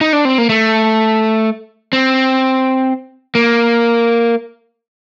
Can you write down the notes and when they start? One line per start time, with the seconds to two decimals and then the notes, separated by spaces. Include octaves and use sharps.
0.01 D#4
0.13 D4
0.25 C4
0.38 A#3
0.49 A3
1.93 C4
3.35 A#3